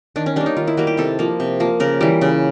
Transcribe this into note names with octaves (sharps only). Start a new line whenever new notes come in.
D#3 D4
C#4
G3 A#3 D4
D#4
D#3 F4
E4
G3 A#3 F#4
G4
C3 A4
F3 A#3
C3
F3 A#3
C#3 A#4
E3 G3
C#3